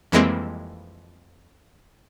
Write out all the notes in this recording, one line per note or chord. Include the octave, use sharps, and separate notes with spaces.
F2 E3 G3 G#3 A#3 C4